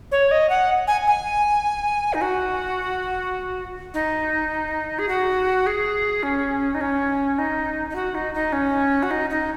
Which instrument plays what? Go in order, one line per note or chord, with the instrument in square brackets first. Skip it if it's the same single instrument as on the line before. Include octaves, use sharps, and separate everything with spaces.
[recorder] C#5
D#5
F#5
G#5
G#5
D#4
F#4
D#4
G#4
F#4
G#4
C#4
D#4
C#4
D#4
D#4
F#4
D#4
D#4
C#4
F#4
D#4
D#4